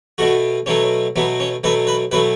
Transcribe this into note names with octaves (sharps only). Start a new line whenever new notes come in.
B2 A3 F#4
B2 F#3 A3 C#4
B2 F#3 A3 B3
C#4
B2 F#3 A3 B4
B4
B2 F#3 A3 B4